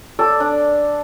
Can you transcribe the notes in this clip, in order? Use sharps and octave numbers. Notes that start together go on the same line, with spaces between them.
A4 D5
D4